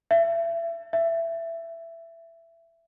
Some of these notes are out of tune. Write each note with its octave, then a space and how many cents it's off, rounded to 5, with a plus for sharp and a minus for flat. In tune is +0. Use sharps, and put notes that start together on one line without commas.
E5 +30
E5 +15